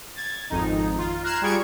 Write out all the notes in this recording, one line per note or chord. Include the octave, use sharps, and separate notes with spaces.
G#6 A6
G#1 F2 D#4
F4
A#5 F6 F#6 G#6 C7 E7
G3 F4 G#4 C#6 G#6 D7